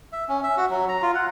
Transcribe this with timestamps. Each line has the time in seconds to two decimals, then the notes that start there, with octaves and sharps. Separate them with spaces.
0.12 E5
0.29 C#4
0.43 E5
0.57 F#4
0.70 F#3
0.89 A#5
1.02 F4
1.15 F#5